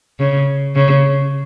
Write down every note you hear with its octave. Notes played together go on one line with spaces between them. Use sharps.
C#3
C#3